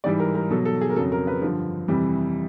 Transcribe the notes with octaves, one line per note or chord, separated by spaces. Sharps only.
G#2 E3 G3 D5
A#4
A#4
B2 F#3 A4
A4
G#4
A#4
F2 C#3 F#3 A4
A#4
B4
G2 D3 F3
F2 C3 E3 G3